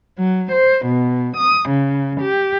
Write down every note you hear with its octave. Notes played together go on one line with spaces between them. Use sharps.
F#3
C5
B2
D#6
C#3
G4